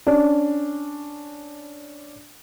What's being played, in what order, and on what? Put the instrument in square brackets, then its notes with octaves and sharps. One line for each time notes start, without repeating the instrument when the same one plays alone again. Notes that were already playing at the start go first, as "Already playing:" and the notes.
[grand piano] C#4 D4 D5